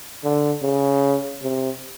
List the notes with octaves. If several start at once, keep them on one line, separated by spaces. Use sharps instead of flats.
D3
C#3
C3